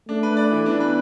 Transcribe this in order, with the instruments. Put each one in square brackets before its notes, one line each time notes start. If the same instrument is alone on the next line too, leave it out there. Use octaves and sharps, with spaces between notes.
[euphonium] A3 [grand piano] D4
[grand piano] B4
D5
E3
[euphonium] B3 [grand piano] D4
[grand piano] B4